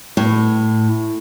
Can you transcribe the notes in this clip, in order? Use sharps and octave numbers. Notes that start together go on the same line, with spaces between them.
A2